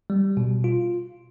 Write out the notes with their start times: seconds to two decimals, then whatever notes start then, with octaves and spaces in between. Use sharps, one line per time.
0.10 G3
0.37 B2
0.64 F4